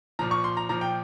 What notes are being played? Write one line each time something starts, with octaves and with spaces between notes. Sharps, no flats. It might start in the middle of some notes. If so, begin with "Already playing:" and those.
A#2 F3 A#5
C#6
C6
A#5
A#2 F3 A#5
G5